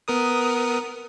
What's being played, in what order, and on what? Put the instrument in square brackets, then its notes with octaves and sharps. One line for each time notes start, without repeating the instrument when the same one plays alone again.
[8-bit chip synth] B3 A#4 D#6